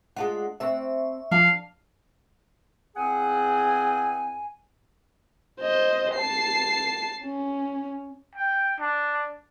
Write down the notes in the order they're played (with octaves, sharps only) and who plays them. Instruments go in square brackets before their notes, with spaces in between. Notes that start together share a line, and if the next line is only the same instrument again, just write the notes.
[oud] G#3 D4 F4 [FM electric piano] F#5
[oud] C4 D4 [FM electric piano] E5 C#6
[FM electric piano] F3 [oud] D4 [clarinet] F5
[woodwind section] E2 C4 G#4 F#5 G#5
[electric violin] C5 D#5
A5 C7
C#4
[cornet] G5
D4